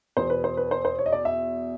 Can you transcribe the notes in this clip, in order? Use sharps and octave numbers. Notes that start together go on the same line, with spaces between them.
E2 B2 C5
B4
C5
B4
C5
C5
C#5
D#5
D5
E5